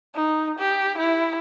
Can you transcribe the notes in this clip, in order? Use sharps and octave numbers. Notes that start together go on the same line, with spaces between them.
D#4
G4
E4